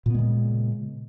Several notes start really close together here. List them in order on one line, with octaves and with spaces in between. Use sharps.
A#2 B3 G#3 C#3